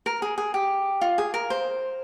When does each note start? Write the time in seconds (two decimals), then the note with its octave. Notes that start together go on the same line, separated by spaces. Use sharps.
0.06 A#4
0.22 G#4
0.38 G#4
0.54 G4
1.01 F4
1.18 G#4
1.34 A#4
1.50 C5